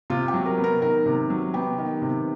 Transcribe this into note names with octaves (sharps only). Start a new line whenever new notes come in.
C3 F4
G4
F#3
A#4
B3
A#4
D#3 A#4
C3
F#3
B3 G4
D#3
C3